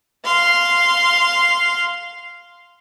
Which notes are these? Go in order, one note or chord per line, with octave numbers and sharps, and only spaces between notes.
F5 C6